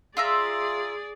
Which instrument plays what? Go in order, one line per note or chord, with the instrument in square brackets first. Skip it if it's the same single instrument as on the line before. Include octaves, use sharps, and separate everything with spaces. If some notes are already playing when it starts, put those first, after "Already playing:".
[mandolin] F4 E5 A#5 [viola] G#4 D5